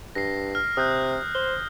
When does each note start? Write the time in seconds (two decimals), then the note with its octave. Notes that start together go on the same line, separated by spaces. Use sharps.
0.15 G2 A#6 C7
0.55 F6
0.77 C3 D#6 F#6 G6
1.35 C5 G7